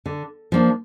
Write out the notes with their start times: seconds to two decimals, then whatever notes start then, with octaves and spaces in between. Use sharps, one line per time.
0.06 D3
0.52 F3 A#3 D4